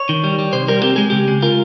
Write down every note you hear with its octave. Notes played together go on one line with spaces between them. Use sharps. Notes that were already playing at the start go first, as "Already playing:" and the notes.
Already playing: C#5
D#3
G3
G3
C3 C5
G3 A#4
C4 G4
G#3 G#4
C#3 G4
G#3
F4 A#4